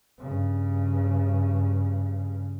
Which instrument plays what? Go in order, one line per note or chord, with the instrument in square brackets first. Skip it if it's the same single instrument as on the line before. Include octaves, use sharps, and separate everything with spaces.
[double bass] G2 C#3